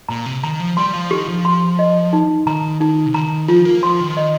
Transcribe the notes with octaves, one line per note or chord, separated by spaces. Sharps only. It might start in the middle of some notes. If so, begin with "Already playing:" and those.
A#2 A#5
C3
D#3 A#5
F3
G3 C6
F3
D#3 G4
F3
C6
D#5
D#4
D#3 A#5
D#3 D#4
C3
D#3 A#5
F3 F4
A#3
F3 C6
D#3
D#5